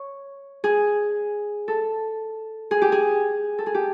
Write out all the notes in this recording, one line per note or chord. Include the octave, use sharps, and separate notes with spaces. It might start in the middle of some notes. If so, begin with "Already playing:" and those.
Already playing: C#5
G#4
A4
G#4
G4
G#4
A4
G#4
G4